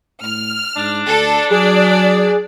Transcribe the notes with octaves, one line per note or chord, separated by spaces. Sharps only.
A2 F6
G#2 D4
D2 A4
F#3 G#4 D5